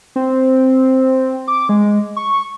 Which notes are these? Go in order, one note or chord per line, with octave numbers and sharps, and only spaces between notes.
C4
D6
G#3
C#6